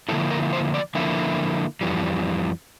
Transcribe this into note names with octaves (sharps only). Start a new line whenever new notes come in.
D3 F3 A#3 E4 A4
A#4
C5
D5
D3 F3 A#3 E4 E5
F2 E3 G3